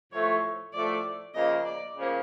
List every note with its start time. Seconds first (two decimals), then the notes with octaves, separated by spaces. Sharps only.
0.12 A2 F3 A3 C#5
0.74 A2 F3 A3 D5
1.35 C#3 F3 A#3 D#5
1.66 D5
1.97 C#3 F3 A#3